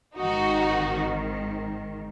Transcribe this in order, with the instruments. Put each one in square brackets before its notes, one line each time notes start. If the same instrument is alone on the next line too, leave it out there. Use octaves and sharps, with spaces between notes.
[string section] G#1 G#2 D#3 D#4 F#4